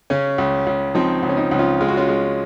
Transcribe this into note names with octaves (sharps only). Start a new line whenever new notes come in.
C#3 C#4
C#2
C#2
F3 C4 D#4
C#2
C#4
C4 D#4
C#2
C#4 F4
G#3 F4
F#4
C#4 F4
G#3